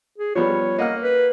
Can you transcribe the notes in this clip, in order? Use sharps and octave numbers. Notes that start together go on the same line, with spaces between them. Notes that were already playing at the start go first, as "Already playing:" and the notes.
G#4
F3 G3 B3 C#5
A#3 D#5 F#5 F6
B4